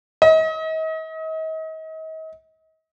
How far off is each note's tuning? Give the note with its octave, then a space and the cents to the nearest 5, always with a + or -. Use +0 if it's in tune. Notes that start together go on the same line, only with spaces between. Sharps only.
D#5 +40